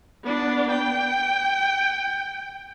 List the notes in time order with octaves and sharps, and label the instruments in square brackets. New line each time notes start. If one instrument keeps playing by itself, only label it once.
[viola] B3 D4
G5